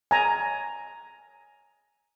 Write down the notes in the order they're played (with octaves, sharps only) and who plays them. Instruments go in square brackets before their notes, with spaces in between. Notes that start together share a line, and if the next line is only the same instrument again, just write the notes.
[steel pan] G#5 A#5